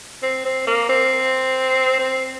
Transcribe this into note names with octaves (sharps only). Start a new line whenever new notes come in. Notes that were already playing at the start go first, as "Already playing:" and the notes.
C4
C4
A#3
C4
C4